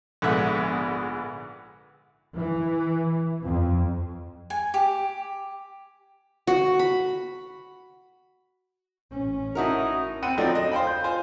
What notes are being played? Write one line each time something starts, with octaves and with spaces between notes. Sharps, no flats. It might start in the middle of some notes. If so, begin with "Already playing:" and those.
A#1 G#2 D3 B3 E5 F#6
E3
F2
G#5
G4
F#4
B5
A1 C#4
D#4 E4 F#4 A#4
C4 F#5 B5 D#7
F3 F#3 A3 C4 D4 D#4
D#5
C5 F5 G5 B5
G6
F4 C5 G#5